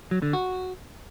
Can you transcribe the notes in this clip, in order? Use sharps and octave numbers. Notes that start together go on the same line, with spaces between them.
F#3
D3
F#4